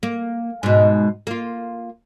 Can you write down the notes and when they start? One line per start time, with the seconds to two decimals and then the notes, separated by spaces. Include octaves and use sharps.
0.03 A#3
0.63 G#2 B2
1.27 A#3 F4